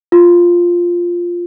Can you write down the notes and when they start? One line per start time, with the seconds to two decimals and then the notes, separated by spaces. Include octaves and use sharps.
0.12 F4